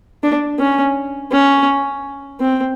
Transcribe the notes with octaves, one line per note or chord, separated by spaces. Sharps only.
D4
C#4
C#4
C4